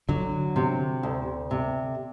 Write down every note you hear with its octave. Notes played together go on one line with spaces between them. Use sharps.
D3 F#3
C3
D2
C3